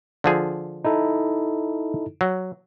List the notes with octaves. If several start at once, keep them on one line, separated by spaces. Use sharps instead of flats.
D3 F3 G#4
D#4 E4 A4
F#3